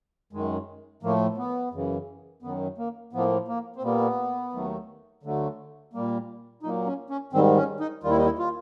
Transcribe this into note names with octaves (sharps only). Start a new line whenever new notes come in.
F#2 D#3 G#3
A2 F3 A3 A#3
B3
F#2 C#3 E3
F#2 D#3 F#3 B3
A#3
A2 F3 A#3 B3
A#3
C4
A#2 G3 A#3 B3
D#2 D#3 F#3 A3
D2 D3 F#3 A3
A#2 G3 A#3
A#2 F#3 A#3 D#4
C#4
C#4
G#2 D#3 G3 C4
C#4
D#4
D#2 D#3 G3 F4
E4
D#4
E4
F4